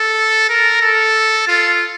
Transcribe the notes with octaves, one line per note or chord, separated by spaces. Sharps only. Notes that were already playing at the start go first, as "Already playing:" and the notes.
Already playing: A4
A#4
A4
F4